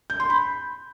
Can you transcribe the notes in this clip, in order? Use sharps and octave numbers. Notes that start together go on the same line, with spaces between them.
G6
C6
B5